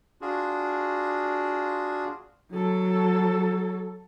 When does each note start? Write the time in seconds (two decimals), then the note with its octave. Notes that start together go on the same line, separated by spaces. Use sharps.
0.21 D4 F4 F#4 G#4
2.51 F#3 A4